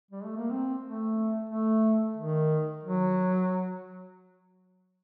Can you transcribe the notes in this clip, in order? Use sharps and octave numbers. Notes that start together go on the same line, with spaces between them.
G3
A3
A#3
C4
A3
A3
D#3
F#3